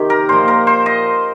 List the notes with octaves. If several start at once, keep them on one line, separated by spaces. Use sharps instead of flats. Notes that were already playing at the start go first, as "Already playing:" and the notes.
Already playing: C3 D#3 G4
A#4
A#2 F3 C5
A#4
C5
D#5